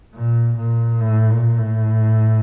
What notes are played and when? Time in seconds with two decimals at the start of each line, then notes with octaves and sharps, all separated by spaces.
0.15 A#2
0.57 A#2
1.01 A2
1.30 A#2
1.58 A2